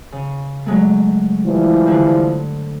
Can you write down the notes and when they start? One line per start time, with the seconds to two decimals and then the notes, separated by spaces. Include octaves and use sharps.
0.12 C#3
0.66 F#3 G#3 A3
1.46 E3 F3 G3
1.86 G2 D3 C5